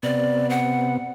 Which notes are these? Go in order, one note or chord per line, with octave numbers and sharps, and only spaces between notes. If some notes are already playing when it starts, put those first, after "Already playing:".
C3 B3 D5
F#5